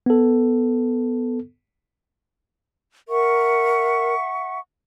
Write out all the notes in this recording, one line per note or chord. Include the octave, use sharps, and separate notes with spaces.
B3 A4
A#4 E5 F#5 C#6